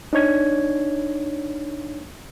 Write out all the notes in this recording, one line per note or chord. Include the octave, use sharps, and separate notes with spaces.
D4 D#4 C#5 G#6